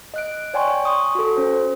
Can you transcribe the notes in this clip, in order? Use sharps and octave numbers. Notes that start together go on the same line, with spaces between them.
D#5 F#6 D7
C#5 D5 G5 G#5 C6 C#6
C6 C#6 D#6
F#4 A4
C#4 C5